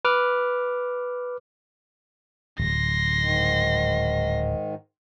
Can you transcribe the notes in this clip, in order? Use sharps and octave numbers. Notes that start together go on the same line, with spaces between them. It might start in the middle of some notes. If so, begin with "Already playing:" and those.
B4 D6 F6
D1 C6 A#6
G#2 D#3